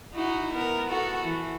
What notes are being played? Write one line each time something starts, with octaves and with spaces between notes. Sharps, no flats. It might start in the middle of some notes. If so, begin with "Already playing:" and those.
D#4 E4 F#4
B3 A#4
F#4 A4
E3